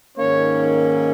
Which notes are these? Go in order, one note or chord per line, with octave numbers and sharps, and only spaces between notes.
G#2 D#3 A#3 C#4 C#5